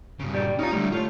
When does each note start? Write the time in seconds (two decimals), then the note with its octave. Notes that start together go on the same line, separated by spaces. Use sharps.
0.20 G2 C#3
0.33 A#2 G4 D5
0.59 C#4 D#4 F4 A#5
0.73 A2 D3 G3
0.92 A3 F4 C#5